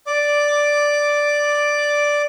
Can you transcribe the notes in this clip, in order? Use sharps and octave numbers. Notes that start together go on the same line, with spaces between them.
D5 D6